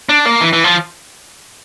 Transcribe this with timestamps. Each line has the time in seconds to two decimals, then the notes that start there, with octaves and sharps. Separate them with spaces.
0.09 D4
0.25 A#3
0.41 E3
0.53 E3
0.64 F3